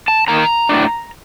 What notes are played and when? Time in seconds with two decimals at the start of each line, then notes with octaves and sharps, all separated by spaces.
0.08 A5
0.28 D#3 A#3 D#4 A#5
0.69 A2 A3 D4